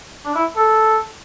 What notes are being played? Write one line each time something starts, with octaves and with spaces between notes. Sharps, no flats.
D4
E4
A4